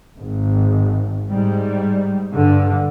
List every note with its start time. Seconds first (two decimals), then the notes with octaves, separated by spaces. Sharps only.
0.18 G#1
1.30 G#2 G3
2.33 G2 D3